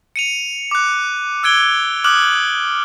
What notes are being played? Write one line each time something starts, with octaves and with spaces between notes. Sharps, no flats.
C#7 D#7 F7
D6 F#6
E6 F#6 G#6 D7 G7
D6 D#6 F6 F#6 F#7